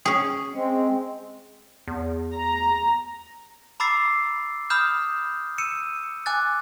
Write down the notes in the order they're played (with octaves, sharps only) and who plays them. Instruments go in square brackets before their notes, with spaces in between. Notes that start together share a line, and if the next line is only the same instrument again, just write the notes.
[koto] C#4 G#4
[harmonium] G#3 C4
[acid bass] E2
[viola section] A#5
[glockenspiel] A#5 B5 D6 E6 A6 C7
B5 D#6 F6 G6 E7
E6 C#7 D#7 E7
G#5 D6 F#6 A6